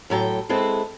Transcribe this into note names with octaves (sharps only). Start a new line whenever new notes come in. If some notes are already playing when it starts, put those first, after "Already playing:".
A2 F#3 A4 G5
G#3 C4 E4 A4 B4